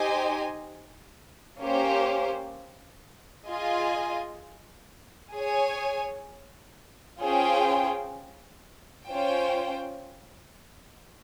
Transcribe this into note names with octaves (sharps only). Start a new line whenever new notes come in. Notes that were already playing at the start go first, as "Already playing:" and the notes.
Already playing: D#4 G4 C5 D#5 G#5
A#3 C#4 G4 C5
F4 G#4 D#5 G#5
G#4 C#5 G#5
C#4 F4 G#4 C5 G5
C#4 F4 C5 G5